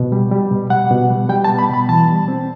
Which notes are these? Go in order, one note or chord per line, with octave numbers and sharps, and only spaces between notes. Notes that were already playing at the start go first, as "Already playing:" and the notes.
Already playing: B2
G3
G3
B2
G3 F#5
B2
G3
G3 G5
A5
B3
B5
B2 B5
E3 A5
G3
C4